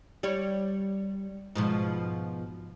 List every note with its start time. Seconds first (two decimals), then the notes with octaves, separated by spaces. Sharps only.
0.23 G3 C#5
1.55 G#2 B2 F3